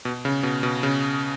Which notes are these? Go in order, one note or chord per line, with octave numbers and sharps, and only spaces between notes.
B2
C#3
B2
B2
C#3